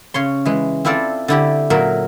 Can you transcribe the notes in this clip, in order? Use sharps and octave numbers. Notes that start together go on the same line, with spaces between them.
C#3 C#5 C6
E3 G#3
C4 E4 F4 A4 D5
D3 E4 G4
A#2 F#3 A#4 E5